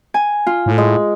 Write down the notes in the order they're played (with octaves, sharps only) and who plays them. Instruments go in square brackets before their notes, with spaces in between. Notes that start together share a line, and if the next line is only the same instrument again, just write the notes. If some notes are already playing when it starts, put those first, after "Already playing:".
[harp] G#5
F4
[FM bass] A2
[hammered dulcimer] G#3